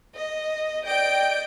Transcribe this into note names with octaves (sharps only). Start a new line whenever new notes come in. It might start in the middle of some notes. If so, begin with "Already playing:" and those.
D#5
D5 D#5 G5 G6 D7